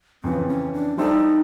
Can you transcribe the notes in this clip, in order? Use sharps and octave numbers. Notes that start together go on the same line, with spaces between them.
F2 C#3 E3 C4
C#4
D4
G3 C4 D#4 E4 A4 D5